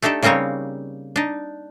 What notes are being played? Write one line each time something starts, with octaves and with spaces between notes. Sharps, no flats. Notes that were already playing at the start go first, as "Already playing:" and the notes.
A3 D4 D#4 G4 A4
C#3 G3 A#3 C4 D#4 C#5
D4 D#4